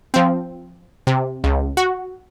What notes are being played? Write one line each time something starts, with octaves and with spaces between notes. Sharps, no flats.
F3 C4
C3
C#2
F#4